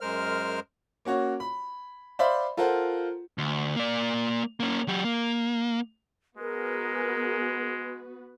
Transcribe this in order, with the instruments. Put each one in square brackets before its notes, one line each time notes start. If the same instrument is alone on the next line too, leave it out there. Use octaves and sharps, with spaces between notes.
[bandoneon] F#2 G#3 A#4 C5 F6
[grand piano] A#3 C#4 F#4 C#5
B5
C5 D5 E5 F5 B5 C6
F4 A4 A#4 C5 F#5
[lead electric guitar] D2
A#3 D5
A#3 C#4
F#3 G4
A#3
[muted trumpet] G#3 [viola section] B3 F#4 B4 [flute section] G#4 A#4